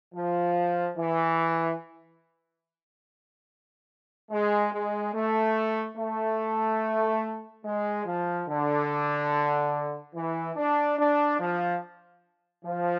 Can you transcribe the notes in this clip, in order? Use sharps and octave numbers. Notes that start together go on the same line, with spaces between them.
F3
E3
G#3
G#3
A3
A3
G#3
F3
D3
E3
D4
D4
F3
F3